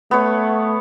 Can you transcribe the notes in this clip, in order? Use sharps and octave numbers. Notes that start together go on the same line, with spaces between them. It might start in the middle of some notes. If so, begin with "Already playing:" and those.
A3 B3 C#5